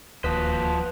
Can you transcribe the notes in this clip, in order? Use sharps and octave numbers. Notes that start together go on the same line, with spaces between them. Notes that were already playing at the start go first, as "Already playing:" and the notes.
D1 D#2 F3 F#4 B4 C5 D#6 B6